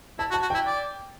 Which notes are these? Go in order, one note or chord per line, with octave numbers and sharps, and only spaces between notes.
E4 A5
F#4
A5
F#4
E4 G5
D5